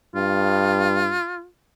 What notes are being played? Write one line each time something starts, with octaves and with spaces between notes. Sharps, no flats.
G2 F4